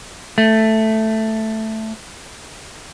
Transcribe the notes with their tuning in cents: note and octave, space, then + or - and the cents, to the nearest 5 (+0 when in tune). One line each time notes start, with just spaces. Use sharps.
A3 +0